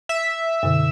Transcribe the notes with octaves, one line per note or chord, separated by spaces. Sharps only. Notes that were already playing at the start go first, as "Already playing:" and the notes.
E5
F#2 B2 D3